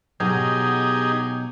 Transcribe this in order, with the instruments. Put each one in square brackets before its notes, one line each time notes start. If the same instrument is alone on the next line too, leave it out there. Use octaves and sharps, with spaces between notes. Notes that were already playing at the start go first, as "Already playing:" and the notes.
[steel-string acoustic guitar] B2 F#3 [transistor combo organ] D#4 G4 G#4